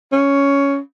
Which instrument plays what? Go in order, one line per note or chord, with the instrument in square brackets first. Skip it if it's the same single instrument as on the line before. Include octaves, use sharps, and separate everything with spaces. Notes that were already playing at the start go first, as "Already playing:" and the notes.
[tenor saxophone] C#4